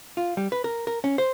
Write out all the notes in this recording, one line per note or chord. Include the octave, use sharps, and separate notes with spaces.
F4
G3
B4
A#4
A#4
C#4
C5